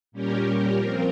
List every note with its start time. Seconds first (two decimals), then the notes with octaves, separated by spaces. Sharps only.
0.12 A#2 G3 C#4 G4 A#4
0.76 F3 C4 F4 A#4